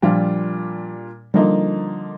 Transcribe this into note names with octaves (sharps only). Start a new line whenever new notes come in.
A#2 F3 G3 D4 F4
D3 F3 G3 A#3 D#4